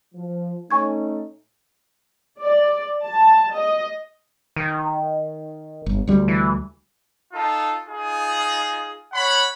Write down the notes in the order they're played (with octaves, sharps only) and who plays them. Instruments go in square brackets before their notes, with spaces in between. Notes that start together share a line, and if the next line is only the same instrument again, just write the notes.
[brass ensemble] F3
[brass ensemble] A3 C#4 D#4 [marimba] G#5 C#6 G#6
[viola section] D5
A5
D#5
[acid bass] D#3
[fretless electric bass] G1
D2 G3
[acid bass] E3
[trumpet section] D#4 F4 A4
D#4 F4 G#4
C#5 F#5 B5